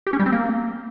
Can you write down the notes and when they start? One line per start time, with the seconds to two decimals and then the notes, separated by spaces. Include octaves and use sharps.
0.07 G4
0.13 C#4
0.19 G3
0.26 C4
0.32 A#3